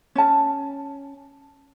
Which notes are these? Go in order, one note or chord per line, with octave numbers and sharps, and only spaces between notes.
C#4 A5